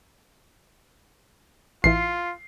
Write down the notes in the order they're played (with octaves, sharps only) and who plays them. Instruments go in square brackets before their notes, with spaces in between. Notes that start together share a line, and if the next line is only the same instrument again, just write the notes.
[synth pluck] A1 E3 E4 [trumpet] F4 [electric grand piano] C7